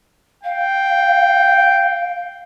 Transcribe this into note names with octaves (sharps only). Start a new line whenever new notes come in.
F5 G5